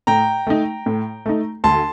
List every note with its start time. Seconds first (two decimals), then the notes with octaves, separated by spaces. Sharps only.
0.07 A2 G5 A#5
0.47 A3 D#4
0.86 A2
1.26 A3 D#4
1.64 D2 A5 C6